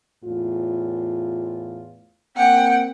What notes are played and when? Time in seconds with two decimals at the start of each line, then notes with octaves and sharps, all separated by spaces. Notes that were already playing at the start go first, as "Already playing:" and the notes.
0.25 E2 A2 F4
2.37 A#3 C4 F#5 G5